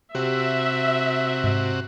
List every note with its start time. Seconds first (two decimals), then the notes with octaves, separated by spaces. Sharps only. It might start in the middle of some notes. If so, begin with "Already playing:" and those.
0.15 C3 F#4 G4 E5
1.44 G#2